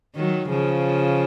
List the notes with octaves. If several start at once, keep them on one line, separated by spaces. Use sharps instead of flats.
D#3 F#3
C#3 F3